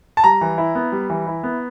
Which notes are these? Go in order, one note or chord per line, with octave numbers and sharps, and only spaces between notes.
A5
G3 A#5
E3
E4
B3
G3
E3
E4
B3